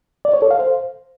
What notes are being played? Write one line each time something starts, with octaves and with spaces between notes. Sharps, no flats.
D5
C#5
A4
F5
C5